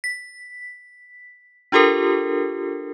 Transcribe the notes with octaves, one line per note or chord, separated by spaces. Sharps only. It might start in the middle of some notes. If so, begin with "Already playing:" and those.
B6
D4 F4 G4 A4 A#4